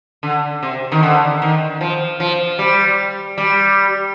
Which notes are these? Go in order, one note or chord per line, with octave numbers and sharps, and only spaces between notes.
D3
C3
D#3
D3
D#3
F3
F3
G3
G3